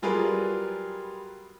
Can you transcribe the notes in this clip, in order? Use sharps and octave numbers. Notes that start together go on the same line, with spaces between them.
F#3 G3 F4 G#4 A#4 B4